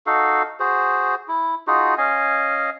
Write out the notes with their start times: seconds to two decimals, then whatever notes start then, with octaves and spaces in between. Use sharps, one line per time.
0.06 D#4 F#4 A4 F5
0.60 F#4 G#4 C5
1.28 E4
1.67 D#4 F4 F#4 G#4
1.98 C#4 D#5 F5 G#5